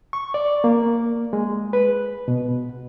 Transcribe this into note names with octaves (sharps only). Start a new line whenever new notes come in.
C#6
D5
A#3
G#3
B4
B2